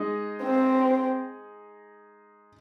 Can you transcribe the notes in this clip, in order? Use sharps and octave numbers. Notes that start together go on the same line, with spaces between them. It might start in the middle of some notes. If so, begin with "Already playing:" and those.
Already playing: G#3 D#4 D#5
C4